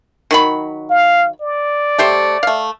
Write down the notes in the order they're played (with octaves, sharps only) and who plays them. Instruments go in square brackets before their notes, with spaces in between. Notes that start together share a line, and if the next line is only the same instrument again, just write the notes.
[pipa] D#3 F#3 B5
[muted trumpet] F5
D5
[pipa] A3 G4 C5
A3 F5